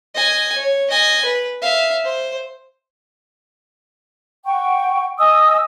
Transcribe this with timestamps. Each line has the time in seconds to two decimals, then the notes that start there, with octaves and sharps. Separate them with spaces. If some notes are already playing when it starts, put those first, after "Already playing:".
0.15 D#5 G#5
0.58 C#5
0.90 D#5 G#5
1.25 B4
1.62 E5 F5
2.04 C5
4.46 F#5 G5 C#6
5.19 D#5 G#5 D#6 E6